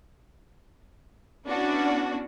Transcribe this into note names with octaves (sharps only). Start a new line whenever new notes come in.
B3 C#4 D4 E4 F#4